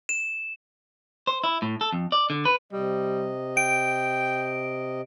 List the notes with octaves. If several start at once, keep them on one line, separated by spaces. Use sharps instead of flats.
E7
C5
E4
A2
A4
F2
D5
D3
B4
C3 G3 D#5
G5 D7